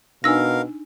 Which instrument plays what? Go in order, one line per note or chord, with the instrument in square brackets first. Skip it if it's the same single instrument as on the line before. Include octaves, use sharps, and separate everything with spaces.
[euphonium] B2 [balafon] D4 D#4 G#5 [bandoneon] A#4 F5 [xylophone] E6 A#6